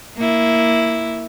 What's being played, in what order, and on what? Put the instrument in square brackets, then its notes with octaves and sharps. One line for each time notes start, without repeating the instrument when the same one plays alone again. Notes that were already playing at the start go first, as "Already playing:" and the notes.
[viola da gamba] A#3 E4